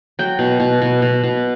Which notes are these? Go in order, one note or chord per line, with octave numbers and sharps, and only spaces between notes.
F#3 G5
B2
B2
B2
B2
B2